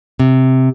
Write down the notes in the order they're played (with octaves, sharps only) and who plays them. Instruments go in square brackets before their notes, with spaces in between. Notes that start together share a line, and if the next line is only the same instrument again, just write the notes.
[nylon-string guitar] C3